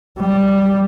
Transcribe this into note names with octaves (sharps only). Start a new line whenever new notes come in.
G3